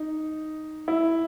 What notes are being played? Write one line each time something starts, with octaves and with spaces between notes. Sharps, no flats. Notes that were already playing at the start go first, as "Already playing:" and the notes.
Already playing: D#4
E4